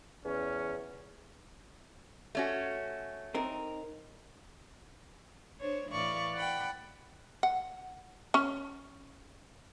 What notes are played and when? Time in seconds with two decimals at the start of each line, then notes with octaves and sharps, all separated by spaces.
0.25 E2 C#4
2.35 A3 C#4 F#4
3.34 C4 D#4 A#4
5.60 D4 C5 C#5
5.90 A2 E3 D5 F5 C#6
6.35 D5 F#5 G5 B5
7.43 F#5
8.34 C#4